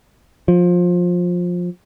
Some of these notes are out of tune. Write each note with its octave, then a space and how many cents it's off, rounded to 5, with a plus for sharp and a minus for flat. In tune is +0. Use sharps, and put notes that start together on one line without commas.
F3 +20